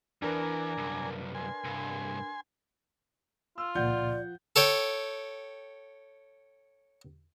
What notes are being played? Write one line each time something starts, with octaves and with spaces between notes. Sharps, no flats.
E2 E3 D4 A#4 B4 D5 G#5 A#5
C2 F#2
G#5 C6
C2 G2
F4 E6
C#2 A#2 F3 D5 F#5 G6
A4 C#5 G5